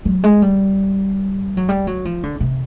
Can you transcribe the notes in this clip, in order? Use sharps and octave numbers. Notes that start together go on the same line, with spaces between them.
F#3
G#3
G3
F#3
G3
F#3
F3
D3
C3